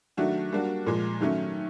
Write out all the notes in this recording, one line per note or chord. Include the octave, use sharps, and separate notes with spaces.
D#3 F#3 A3 D4 F#4
G3 A#3 D4 F#4
A#2 F3 G#3
D#3 F#3 A3 C#4